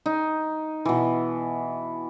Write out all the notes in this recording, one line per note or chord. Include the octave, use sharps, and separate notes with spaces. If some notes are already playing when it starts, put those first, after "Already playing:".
D#4
B2 E3